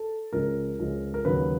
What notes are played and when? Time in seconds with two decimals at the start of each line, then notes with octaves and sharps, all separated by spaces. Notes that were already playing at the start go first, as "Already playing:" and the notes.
Already playing: A4
0.33 C#2 C#3 F3 G#3 A#4
0.79 C#2 C#3 F3 G#3
1.14 A#4
1.25 D#2 C#3 F#3 B4